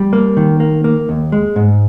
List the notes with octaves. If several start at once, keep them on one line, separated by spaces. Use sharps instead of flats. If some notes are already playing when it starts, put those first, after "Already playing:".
Already playing: G3
A#3
D#3
A#3
A#3
D#2
G#3
G#2